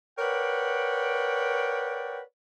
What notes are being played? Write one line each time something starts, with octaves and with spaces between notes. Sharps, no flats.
A#4 B4 C#5 D5 F#5 G5